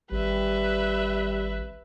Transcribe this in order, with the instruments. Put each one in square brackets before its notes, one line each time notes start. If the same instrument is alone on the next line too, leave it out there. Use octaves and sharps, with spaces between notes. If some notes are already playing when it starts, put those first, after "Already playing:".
[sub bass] G#1 [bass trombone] G3 [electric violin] B4 E5